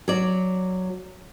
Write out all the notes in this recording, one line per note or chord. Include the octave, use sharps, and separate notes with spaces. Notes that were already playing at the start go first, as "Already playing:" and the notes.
F#3 D5